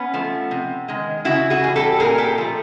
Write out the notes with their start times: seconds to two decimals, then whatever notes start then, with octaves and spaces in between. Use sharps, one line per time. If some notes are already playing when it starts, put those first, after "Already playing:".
Already playing: B3 C#4
0.14 F3 A3
0.51 C3
0.88 D#3 G#3
1.25 C#3 E4 F#4
1.50 F#4 G#4
1.63 E3 G3 G#4
1.76 G4 A4
2.00 A#2 G#4 A#4
2.18 G4 A4
2.38 F3 A3